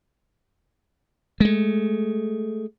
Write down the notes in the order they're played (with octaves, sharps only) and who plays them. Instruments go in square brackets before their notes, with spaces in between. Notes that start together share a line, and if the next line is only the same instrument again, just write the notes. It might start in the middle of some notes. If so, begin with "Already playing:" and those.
[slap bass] G#3 A3